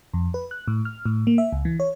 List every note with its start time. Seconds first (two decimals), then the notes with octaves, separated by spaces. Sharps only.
0.14 F2
0.34 B4
0.51 F#6
0.68 A2
0.85 F6
1.05 A2
1.27 A#3
1.38 E5
1.52 C#2
1.65 E3
1.80 C#5